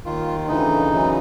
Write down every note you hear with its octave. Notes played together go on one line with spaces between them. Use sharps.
D#2 D#3 F4
D2 C#3 E3 D#4
F#2 C#3 E3